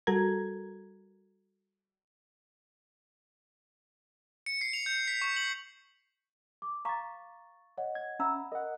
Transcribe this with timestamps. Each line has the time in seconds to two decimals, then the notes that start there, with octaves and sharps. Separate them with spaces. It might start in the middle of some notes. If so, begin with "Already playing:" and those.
0.07 G3 F#4 A4 A#4 A#5 G#6
4.46 C#7
4.61 C7
4.73 F7
4.86 G6
5.08 B6
5.22 C#6
5.36 F#7
6.62 D6
6.85 F5 A#5 C#6 D6 A6
7.77 C#5 D#5 F#5
7.95 G#6
8.19 C#4 E5 F#5 A#5 B5 E6
8.52 A#4 D#5 F#5